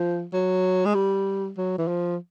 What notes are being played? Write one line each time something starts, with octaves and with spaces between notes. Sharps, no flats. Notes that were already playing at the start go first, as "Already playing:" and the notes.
Already playing: F3
F#3
G#3
G3
F#3
E3
F3